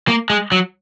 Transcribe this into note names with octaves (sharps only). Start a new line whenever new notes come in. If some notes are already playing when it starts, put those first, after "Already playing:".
A#3
G#3
F#3